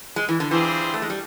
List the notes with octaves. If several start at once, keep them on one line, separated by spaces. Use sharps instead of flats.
G#3
E3
D3
E3 G3 C4 F4 G#4 C5
A3
G#3
G3